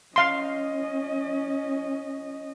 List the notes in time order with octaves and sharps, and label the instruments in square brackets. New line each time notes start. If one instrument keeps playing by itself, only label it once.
[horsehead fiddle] C#4 D#5 [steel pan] F5 C6